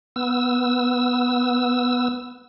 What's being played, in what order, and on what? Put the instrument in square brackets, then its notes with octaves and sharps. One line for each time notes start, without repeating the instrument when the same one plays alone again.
[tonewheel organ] B3 E6